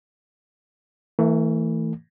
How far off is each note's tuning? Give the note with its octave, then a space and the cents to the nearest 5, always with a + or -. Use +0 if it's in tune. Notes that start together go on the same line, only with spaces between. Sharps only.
E3 -10 A3 +40